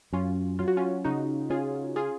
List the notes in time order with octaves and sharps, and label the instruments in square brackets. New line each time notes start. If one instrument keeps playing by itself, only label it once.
[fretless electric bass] F#2 [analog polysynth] C#4 F4
[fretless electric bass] F#3 [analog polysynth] F4
[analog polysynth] F#4
C#4 F4
[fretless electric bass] C#3 [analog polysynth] D#4 F#4
[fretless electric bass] C#4 [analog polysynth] F4 G#4
[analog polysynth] F4 G#4